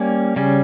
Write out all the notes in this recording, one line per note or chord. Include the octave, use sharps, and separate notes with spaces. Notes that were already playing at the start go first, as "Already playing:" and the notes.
Already playing: G3 A#3 C#4
C#3 G3 C#4